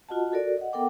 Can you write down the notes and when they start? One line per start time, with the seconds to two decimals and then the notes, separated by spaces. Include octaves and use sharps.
0.09 F4 F#4 D#5 F#5 A5
0.32 F#4 A4 A#4 D5
0.57 D#5 F#5
0.73 B3 A4 A#4 F#5 G5 D6